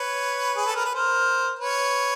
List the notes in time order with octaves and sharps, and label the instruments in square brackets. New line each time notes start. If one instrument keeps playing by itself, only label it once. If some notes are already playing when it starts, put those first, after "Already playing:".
Already playing: [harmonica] B4 C#5
G#4
A4
A#4
B4
A#4 C5
B4 C#5